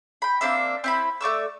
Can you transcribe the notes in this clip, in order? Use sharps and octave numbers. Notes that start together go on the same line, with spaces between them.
G5 B5
A#3 C4 D4 E5
C4 E4 B5
A3 D5 C#6 E6